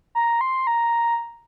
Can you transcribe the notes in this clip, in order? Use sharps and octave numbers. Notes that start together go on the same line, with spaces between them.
A#5
C6
A#5